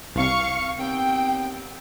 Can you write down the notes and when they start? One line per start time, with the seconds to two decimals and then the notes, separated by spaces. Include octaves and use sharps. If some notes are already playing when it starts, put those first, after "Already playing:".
0.15 C2 C3 F5 C#6 C#7
0.78 D#2 B3 C4 G5